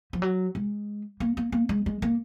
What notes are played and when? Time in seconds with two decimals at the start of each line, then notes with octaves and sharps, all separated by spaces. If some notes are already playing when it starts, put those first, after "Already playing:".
0.13 F3
0.22 F#3
0.55 G#3
1.20 A#3
1.37 A#3
1.52 A#3
1.69 G#3
1.86 G#3
2.02 A#3